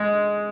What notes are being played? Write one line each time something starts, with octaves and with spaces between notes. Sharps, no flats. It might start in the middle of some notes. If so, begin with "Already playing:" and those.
Already playing: G#3